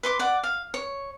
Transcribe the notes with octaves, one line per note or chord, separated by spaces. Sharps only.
B4 C6 D6
D5 F#5
F5
C#5